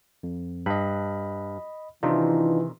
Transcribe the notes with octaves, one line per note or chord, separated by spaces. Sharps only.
F2
G2 D#5 B5
C3 D#3 E3 D4 D#4 F4